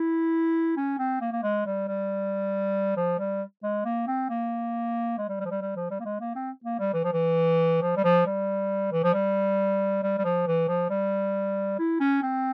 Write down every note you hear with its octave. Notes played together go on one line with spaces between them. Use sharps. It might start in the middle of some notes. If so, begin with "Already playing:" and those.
Already playing: E4
C#4
C4
A#3
A#3
G#3
G3
G3
F3
G3
G#3
A#3
C4
A#3
G#3
G3
G3
F3
G3
G3
F3
G3
A#3
G#3
A#3
C4
A#3
G3
E3
F3
E3
F3
G3
F3
G3
E3
F3
G3
G3
G3
F3
E3
F3
G3
E4
C#4
C4